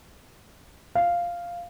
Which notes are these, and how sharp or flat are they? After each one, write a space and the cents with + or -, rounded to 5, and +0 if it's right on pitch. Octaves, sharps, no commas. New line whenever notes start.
F5 -5